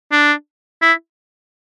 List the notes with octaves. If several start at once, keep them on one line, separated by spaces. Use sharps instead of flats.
D4
E4